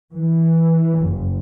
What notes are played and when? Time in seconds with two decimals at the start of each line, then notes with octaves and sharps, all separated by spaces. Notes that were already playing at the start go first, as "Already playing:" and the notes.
0.12 E3
0.99 F#1